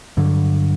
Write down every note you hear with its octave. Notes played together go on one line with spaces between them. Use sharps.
G2 D3 F#3